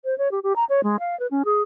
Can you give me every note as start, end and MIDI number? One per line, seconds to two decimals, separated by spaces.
0.05 0.17 72
0.18 0.31 73
0.32 0.40 67
0.43 0.53 67
0.56 0.64 82
0.69 0.83 73
0.83 0.97 56
1.00 1.18 77
1.20 1.27 71
1.31 1.43 61
1.45 1.62 68